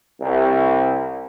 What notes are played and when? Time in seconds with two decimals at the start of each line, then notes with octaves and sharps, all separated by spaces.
0.20 C2